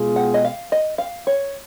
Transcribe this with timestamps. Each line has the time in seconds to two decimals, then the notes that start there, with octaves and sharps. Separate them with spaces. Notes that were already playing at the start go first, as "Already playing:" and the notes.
Already playing: B2 G#3 B3 F4 G#4
0.16 F#5
0.34 D#5
0.45 F5
0.72 D#5
0.98 F5
1.27 C#5